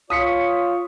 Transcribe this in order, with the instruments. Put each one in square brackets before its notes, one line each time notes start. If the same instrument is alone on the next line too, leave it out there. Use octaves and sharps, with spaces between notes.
[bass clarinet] F4 [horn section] C#5 [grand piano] D#6 B6 C#7